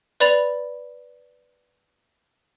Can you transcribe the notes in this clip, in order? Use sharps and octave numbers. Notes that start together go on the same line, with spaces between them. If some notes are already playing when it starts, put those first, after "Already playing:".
B4 D5 B5 A6 F7